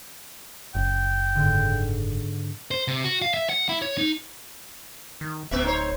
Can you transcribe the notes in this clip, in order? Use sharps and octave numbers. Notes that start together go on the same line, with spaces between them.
F#1 G5
G#2 D3
C5
C3
F#4
F5
E5
F#5
E4
C#5
D#4
D#3
D1 C3 B3 E5
D#4 C5 C#5